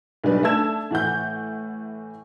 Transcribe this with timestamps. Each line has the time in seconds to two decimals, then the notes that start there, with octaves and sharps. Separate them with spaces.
0.24 B1 G3 D4 B4
0.43 A3 D4 A5 E6 G#6 E7
0.91 A2 E3 F#5 G6